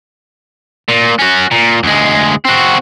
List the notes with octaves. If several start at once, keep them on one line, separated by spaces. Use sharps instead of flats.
A#2
C#4 F#4
A#2
D2 G#3
C4 F#4